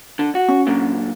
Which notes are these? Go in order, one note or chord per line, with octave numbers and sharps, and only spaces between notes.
D3
F#4
C#4
F#2 A#2 D3